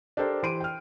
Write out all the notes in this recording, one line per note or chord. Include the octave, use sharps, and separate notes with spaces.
D4 G4 A4 A#4 C5
E3 G4 C5 C6 D7 D#7
G5 F6